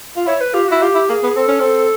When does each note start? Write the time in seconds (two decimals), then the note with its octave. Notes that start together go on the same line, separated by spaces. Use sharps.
0.16 F4
0.26 E4 C#5
0.41 B4
0.54 F4 G4
0.68 E4 F#4
0.82 F4 G4
0.95 E4
1.09 A#3 G#4
1.23 B3
1.36 C4 A4
1.48 C#4
1.60 C4